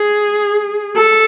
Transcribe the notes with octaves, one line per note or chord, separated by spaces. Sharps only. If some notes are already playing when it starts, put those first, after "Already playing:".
Already playing: G#4
A4